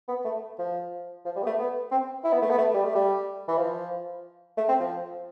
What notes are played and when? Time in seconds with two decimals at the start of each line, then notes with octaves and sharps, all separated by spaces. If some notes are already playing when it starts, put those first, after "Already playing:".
0.08 B3
0.24 A3
0.58 F3
1.25 F3
1.36 G3
1.43 B3
1.46 A3
1.58 B3
1.91 C4
2.24 E4
2.33 B3
2.42 A3
2.50 B3
2.58 A3
2.74 G3
2.85 A3
2.95 G3
3.48 E3
3.57 F3
4.57 A3
4.68 C4
4.80 F3